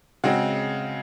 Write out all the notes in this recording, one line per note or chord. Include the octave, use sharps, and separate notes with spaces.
C#3 G#3 C4 F#4